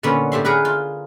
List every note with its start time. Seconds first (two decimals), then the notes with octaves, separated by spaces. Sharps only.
0.03 A#2 D3 B3 C#4 B5
0.32 A2 G4 E5 C6
0.45 G#4 A#4 B4 F#5
0.65 F4